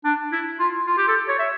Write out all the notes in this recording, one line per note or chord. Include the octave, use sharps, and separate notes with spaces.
D4
E4
F4
F4
G4
A4
C#5
E5